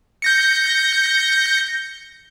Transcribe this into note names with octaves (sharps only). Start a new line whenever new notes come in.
G6 A#6 C#7